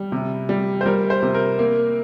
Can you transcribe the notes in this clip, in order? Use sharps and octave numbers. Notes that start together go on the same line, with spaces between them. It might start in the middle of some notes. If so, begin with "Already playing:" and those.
Already playing: G3
C3
G3
C5
G3 A#4
C5
C3
A#4
A#3